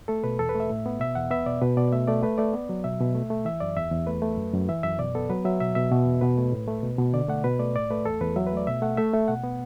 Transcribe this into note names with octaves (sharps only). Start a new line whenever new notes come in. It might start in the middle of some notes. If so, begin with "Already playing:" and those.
A3 A4
B2 B4
E2 A4
B4
A3
E5
A2
B3
B2 E5
E2 F#5
B3 E5
B2 D5
B2 B4
B2 D5
A3 E5
A3 D5
A3 B4
A3 D5
B3
F#3
B2 E5
B2
A3
A3
E3 E5
F#2 D5
E2 E5
E2
A3 B4
A3
F#2
F#2
E3 E5
F#2 E5
B2 D5
B3 A4
F#3 B4
F#3 E5
B2 E5
B2 E5
B2
E2
B2 B4
A3
A2
A3
B2
B2
D3 D5
A3 F#5
B2 B4
A3 D5
A2 D5
A3 B4
E2 A4
E2 B4
F#3 E5
B4
A3 D5
B2 E5
A3 F#5
A3 E5
A3
B2 F#5
B3